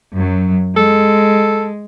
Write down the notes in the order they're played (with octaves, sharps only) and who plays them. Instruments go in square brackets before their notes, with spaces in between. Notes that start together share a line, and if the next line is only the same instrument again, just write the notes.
[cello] F#2 F#3
[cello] G#3 [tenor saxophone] A4